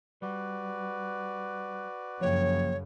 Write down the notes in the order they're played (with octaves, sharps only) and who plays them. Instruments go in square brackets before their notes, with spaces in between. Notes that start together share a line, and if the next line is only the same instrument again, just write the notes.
[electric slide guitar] G3 [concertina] F#4 B4 D5
[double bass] F#2 C#3 [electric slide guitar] F3 A#3 G5 [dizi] C#5